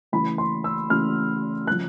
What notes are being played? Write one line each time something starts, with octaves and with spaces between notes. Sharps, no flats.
C#3 E3 A3 B5
C6
E6
C#3 E3 A3 F6
C#3 F3 F#6